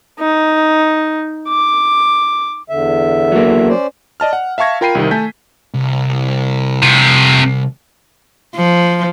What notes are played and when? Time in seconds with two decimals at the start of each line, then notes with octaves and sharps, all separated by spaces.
0.20 D#4
1.49 D6
2.70 E2 D3 E5
3.32 F#3 A#3
3.68 C#4 C5 D5
4.20 D5 D#5 A5 F6
4.33 F#5
4.58 E5 F5 A5 C#6 G#6 A#6
4.81 F4 A#4 G5 B5 C7 D#7
4.95 C2 C3 D#3
5.11 A3 G#5 A5 G6 B6
5.74 C2
6.83 C3 F4
8.56 F3